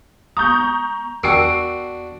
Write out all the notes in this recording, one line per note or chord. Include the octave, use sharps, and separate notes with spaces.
G#3 B3 A#5 C#6 D#6 G6
E2 D4 F#4 A#4 G5 E6 C7 D7